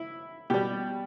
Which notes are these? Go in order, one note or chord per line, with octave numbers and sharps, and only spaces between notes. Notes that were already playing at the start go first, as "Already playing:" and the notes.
Already playing: E4
B2 G3 G4